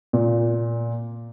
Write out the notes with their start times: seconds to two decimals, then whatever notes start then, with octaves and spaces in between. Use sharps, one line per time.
0.13 A#2